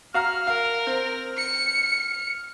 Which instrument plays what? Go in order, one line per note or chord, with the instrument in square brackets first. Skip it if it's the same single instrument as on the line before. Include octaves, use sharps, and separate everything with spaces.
[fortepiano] F#4 F5 A#5 [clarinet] F6
[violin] A#4 [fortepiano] F5
[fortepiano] C4
[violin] C#7